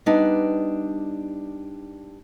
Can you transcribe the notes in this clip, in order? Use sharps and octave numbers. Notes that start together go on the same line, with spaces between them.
G3 B3 D4 D#4